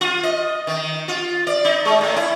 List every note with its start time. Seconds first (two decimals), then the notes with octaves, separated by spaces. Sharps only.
0.01 F4
0.23 D#5
0.67 D#3
1.08 F4
1.47 D5
1.65 D#4
1.85 G#3
2.01 A2
2.16 E4